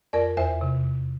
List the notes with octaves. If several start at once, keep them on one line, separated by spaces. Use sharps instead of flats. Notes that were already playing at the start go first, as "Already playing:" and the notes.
F2 A#4 D5
E2 C5 E5
C3